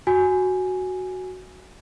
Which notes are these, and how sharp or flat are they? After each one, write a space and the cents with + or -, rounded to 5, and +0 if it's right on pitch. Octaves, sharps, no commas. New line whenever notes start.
F#4 +0 G#5 +0